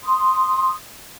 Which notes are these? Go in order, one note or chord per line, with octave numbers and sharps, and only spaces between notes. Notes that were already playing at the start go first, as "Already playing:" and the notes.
C6 D#6